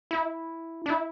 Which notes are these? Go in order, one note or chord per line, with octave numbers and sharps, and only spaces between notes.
E4
D4
E4